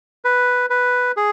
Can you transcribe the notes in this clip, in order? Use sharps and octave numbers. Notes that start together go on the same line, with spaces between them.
B4
B4
G#4